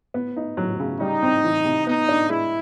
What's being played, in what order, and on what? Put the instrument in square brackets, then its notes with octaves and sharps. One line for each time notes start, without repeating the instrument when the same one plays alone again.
[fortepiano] B3
D#4
F#3
C#3
[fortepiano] G3 [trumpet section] D#4
[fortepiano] C4
E3
C3
[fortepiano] B3 [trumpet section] D#4
[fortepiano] D4
[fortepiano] G#3 [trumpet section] E4